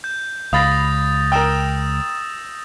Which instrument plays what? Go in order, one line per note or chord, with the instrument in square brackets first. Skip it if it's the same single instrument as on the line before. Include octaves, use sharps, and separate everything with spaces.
[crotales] G6
[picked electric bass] C#2 [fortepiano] F5 B5 [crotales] D#6 A6 A#6
[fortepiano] A#4 G5 [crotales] D#6 E6 E7